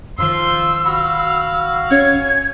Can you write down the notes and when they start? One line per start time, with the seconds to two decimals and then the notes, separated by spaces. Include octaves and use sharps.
0.18 F#2 D#3 F3 C6 E6
0.86 F#4 F5 B5
1.91 C#4 C#5 G#6